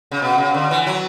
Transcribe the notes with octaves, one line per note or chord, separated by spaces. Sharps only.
C#3
B2
C#3
D3
E3
F#3